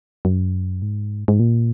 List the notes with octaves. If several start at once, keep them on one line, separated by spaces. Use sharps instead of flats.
F#2
G#2
G#2
A#2